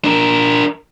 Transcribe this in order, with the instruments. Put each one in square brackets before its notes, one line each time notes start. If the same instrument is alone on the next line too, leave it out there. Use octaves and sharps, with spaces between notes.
[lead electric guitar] D4 A#4